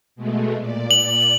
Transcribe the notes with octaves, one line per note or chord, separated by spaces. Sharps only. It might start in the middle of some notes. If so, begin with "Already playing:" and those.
B2 G#3 A3
A#2 D5
F#7